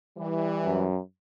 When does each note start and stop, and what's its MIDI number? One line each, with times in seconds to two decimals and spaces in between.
0.17 0.85 52
0.17 0.85 55
0.65 1.00 42